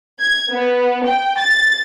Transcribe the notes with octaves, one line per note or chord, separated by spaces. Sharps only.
G#6
B3
G5
A6